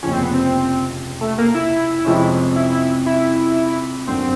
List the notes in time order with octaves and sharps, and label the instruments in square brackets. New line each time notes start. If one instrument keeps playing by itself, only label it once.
[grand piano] F1 D#2 C#3 F3 [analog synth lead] C#4
[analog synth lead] C4
B3
C4
A3
A#3
E4
[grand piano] F2 C3 F3 G#3 C#4
[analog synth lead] E4
E4
[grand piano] G1 F#2 D3 [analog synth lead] C4